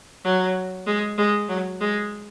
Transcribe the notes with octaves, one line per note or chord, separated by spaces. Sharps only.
F#3
G#3
G#3
F#3
G#3